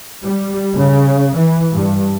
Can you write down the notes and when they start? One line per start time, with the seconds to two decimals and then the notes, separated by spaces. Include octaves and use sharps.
0.23 G3
0.76 C#3
1.36 E3
1.73 G2